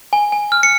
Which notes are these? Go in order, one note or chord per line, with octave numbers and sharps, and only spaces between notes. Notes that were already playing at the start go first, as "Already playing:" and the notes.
G#5
G#5
F6
C#7